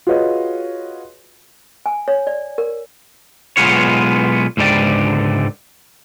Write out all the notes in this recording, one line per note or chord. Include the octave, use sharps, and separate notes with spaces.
F4 F#4 G#4 B4 C#5 D#5
G#5
C#5
D5
A#4
B1 F#2 G#3 B3 F4 C#5
C#2 G#2 D3 G4 D5